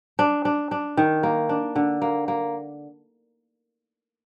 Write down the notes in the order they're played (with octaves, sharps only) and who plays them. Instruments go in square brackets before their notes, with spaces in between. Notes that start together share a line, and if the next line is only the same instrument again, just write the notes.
[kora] D4
D4
D4
D#3
A#3
D4
D3
A#3
A#3